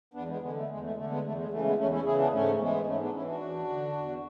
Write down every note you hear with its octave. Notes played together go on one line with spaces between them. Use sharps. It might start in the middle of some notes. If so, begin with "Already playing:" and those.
E2 B3 D4
G#3 B3
D3 G#3 B3
A3
E2 G#3
A3
D3 A3
G#3 B3
E2 A3
G#3
C#3 E3 A3
G#3 B3
E2 A3 C#4
C#4 E4
C#3 E3 E4 G#4
B3 D4
G#2 A3 C#4
E3 G#3 B3
G#2 A3 C#4
B3 D4
E3 C#4 E4
D4 F#4
E2
D3
E2